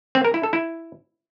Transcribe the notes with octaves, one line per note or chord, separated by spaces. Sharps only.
C4
A#4
E4
A4
E4